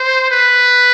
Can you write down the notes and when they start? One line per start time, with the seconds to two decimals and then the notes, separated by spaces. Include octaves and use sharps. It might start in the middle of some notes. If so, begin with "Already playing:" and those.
Already playing: C5
0.31 B4